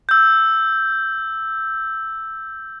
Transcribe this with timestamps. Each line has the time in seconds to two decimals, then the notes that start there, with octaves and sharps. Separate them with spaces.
0.09 E6 G6